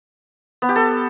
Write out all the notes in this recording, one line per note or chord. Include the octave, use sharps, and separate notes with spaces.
B3
G4
A4